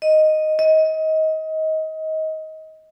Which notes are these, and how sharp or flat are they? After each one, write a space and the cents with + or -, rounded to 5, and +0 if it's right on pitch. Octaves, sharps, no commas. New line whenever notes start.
D#5 -5
D#5 +25